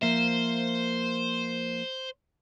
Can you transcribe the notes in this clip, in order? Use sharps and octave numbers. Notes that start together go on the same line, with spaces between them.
F3 A#3 C5 E5